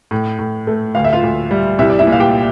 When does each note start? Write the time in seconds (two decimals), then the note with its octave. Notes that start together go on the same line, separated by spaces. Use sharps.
0.11 A2
0.39 A2
0.67 A3
0.95 D2 F5
1.04 E5
1.13 F4 F5
1.23 D2
1.51 G3
1.79 C2 E4 E5
1.90 D5
1.99 E4 E5
2.07 A#2
2.12 F5
2.20 G4 G5